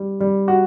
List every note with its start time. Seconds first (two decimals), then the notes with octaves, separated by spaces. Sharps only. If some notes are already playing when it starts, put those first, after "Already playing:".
Already playing: G3
0.20 G3
0.48 F#4